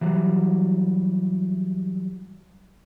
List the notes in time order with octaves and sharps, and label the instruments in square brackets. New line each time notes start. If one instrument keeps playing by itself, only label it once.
[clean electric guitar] E3 F#3 G3